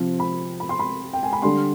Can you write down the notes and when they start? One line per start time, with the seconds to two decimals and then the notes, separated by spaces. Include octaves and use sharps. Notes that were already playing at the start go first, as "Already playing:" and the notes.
Already playing: C3 F3 C4
0.20 B5
0.60 B5
0.69 C6
0.79 B5
1.13 G5
1.23 G#5
1.33 B5
1.42 D3 G3 D4 C6